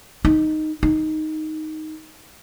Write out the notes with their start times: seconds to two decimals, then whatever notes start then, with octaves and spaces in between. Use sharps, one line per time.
0.25 D#4
0.83 D#4